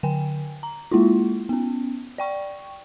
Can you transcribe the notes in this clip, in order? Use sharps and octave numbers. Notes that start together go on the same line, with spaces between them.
D3 G5 G#5
A#5
G#3 A#3 E4 F4
B3 C#4
D5 G5 C#6